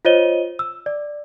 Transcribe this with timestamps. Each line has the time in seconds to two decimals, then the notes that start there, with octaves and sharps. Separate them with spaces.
0.05 F4 C5 C#5 D#5 D#7 G7
0.59 E6
0.86 D5